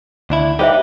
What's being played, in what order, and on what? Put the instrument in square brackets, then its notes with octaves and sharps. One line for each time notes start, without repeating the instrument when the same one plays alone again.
[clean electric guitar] D2 D4 E4
[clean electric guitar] G3 D#4 G4 [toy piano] G#4 C5 E5